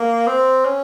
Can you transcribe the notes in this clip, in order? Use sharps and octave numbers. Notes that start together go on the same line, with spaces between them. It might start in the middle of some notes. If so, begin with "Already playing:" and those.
Already playing: A#3
C4
C#4